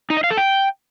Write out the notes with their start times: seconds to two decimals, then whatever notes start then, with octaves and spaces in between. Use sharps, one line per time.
0.10 D#4
0.17 D#5
0.24 F5
0.31 A4
0.37 G5